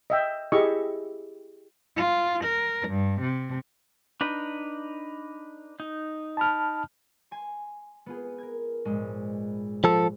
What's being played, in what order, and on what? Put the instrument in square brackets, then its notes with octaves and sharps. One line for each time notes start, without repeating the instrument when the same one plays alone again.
[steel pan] D#5 E5 G5
E4 G4 G#4 D#5 E5 C#6
[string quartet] F4
A#4
G2
C3
[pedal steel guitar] D4 D#4 B4
D#4
[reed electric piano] A5 B5 F6
[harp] G#5 C6
B3 F4 G#4
A#4 G#6
A#1 G#2 G#3
[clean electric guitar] F3 A4